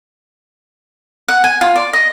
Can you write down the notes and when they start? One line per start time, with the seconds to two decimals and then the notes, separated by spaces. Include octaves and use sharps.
1.28 F#5
1.44 G#5
1.61 F4
1.76 D5
1.93 D#5